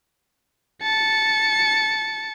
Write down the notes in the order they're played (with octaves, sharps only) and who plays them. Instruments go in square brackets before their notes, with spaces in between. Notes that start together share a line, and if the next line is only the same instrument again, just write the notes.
[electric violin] A5 C#7